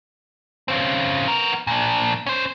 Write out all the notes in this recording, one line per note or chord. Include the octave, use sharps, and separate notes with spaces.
C#3 C4
B3 A#4
A#2 D4
C#4 C5